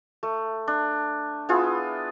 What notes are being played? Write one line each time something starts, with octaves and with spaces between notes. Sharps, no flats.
A3
D4
B3 E4 F4 G#4